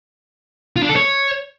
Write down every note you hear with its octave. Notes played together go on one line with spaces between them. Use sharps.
F4
D4
A4
C#5